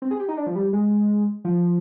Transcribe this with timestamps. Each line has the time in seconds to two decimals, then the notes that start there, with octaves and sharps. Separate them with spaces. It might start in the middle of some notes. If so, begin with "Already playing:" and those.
0.02 C4
0.11 G#4
0.20 G4
0.28 D#4
0.37 D4
0.47 F3
0.55 G3
0.73 G#3
1.45 F3